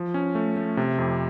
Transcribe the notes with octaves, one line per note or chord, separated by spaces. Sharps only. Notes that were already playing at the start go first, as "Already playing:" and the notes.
Already playing: F3
C#4
A3
A3
C3
F2